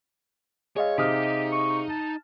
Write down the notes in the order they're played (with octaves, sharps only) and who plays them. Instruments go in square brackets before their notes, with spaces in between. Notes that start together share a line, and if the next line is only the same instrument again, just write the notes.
[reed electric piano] G#4 D#5 F5 [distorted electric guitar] C#5
[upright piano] C3 D#6 F6 [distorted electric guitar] D#4 [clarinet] G4
[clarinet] C#6
A5